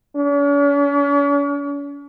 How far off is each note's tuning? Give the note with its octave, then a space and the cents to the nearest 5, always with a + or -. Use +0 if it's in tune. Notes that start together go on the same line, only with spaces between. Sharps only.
C#4 +45